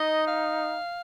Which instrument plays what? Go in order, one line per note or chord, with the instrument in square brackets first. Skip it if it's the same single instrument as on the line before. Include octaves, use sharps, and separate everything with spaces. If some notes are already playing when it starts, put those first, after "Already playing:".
Already playing: [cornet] D#4 [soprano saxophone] D#5
[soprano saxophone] F5